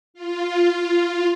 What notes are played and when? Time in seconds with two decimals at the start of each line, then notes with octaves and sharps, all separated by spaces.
0.14 F4